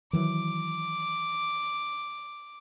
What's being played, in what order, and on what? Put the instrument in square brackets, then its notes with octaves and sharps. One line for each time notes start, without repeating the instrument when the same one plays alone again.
[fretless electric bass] D#3 E3 F#3 [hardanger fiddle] D6